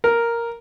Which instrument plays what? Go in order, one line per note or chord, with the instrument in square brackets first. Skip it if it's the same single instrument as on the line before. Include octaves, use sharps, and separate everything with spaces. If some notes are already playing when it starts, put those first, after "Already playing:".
[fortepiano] A#4